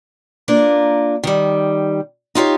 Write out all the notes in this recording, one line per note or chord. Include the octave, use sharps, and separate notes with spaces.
A#3 D4 F4 A#4
D#3 G3
D#4 F4 G4 C#5